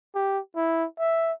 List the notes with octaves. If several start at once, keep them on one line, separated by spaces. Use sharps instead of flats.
G4
E4
E5